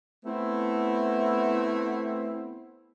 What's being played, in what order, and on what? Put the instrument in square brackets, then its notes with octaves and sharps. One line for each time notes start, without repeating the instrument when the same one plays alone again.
[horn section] A3 B3 C4 E4